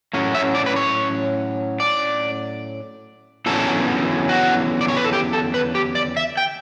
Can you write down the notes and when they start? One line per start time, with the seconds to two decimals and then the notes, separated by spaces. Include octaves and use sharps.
0.14 A2 F#3 C#4
0.35 E5
0.55 D5
0.66 B4
0.76 C#5
1.80 D5
3.46 E2 D3 F#3 C#4 A4
4.29 F#4
4.81 D5
4.88 C#5
4.96 B4
5.05 A4
5.13 G4
5.33 A4
5.54 B4
5.75 G4
5.95 D5
6.17 E5
6.37 G5